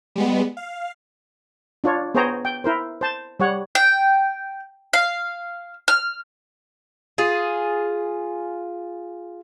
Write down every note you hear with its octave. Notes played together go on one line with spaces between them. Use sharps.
G3 G#3 B3
F5
D4 F4 C#5
B3 G#4 C5 C#5 G5 A#5
G5
E4 A#4 C5
C5 A5
G3 C#5 F#5
G5
F5
F6
F4 G#4